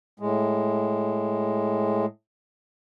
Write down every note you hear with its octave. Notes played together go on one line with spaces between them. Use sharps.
A2 G#3